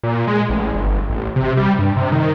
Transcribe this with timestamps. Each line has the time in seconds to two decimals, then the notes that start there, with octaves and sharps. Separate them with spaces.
0.03 A#2
0.27 G#3
0.50 A1
0.75 G1
1.10 A1
1.36 C3
1.57 G3
1.79 G2
1.97 C3
2.12 D#3